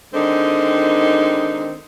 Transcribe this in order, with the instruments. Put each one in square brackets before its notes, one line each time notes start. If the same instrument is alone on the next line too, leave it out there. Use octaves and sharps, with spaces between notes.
[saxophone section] D3 D#3 G#3 C4 D4 D#4